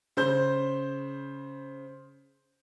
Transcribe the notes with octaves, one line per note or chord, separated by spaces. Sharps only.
C#3 C5 G6